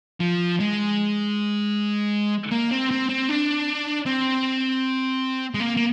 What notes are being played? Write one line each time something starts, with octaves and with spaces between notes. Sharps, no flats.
F3
G#3
A#3
C4
C4
C4
D4
C4
G#3
A#3
A#3